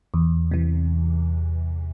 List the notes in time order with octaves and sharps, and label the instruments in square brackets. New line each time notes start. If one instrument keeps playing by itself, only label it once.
[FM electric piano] E2
C3 E3